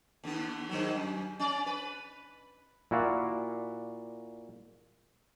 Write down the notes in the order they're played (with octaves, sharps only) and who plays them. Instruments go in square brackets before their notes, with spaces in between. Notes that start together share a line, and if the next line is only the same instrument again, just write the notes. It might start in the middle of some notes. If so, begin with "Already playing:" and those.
[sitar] D#2 D3 B3
G2 D#3 F#3
F#2
C#4 D5
B4
[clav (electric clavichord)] A#2 E4 F#4 D5 F5